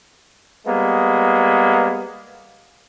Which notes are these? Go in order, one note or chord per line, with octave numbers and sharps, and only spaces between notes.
G3 G#3 A#3 B3